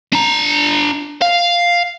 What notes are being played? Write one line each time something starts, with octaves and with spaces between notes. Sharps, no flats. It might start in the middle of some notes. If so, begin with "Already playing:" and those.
D4 A#5
F5